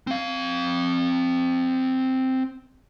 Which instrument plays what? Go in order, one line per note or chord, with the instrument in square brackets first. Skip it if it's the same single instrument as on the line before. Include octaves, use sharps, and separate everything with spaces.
[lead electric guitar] C4 F5